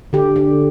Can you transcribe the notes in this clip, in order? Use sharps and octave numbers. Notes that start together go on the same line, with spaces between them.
D3 G4
D3